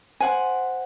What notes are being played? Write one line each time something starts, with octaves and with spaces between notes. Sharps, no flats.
C5 F#5 G#5